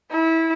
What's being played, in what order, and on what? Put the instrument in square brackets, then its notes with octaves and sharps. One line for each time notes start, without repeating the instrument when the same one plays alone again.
[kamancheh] E4